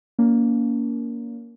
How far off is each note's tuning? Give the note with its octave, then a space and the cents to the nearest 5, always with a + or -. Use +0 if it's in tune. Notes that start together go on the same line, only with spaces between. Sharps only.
A#3 +5 C#4 +40